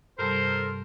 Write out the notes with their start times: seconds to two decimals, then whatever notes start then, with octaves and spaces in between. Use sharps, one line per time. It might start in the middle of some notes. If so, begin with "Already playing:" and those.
0.19 G2 C3 G3 A4 A#4 C5